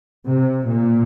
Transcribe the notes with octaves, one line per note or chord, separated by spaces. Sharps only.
C3
A#2